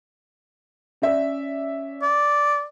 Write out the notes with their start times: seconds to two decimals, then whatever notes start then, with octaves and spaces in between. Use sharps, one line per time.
1.02 C#4 D5 E5
2.02 D5